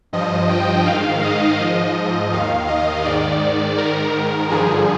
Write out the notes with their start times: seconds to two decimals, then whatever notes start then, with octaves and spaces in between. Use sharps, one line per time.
0.13 G2 F3 D#5
0.49 G5
0.86 G#2 D#3 F5
1.23 D#5
1.59 G#2 F3
2.32 D#2 D#3 F5
2.68 D#5
3.05 G#2 D#3 D5
3.78 G#2 D#3 A#4
4.50 G2 D3 F3 G#4